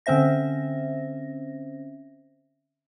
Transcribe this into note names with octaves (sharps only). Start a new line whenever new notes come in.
D3 C4 C#4 C5 E5 A#6